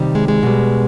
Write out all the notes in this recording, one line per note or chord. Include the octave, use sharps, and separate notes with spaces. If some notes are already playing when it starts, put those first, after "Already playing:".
Already playing: C3 D#3 G3
G#3
G#3
B2 G3